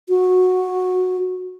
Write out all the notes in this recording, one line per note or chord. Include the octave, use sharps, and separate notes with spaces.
F#4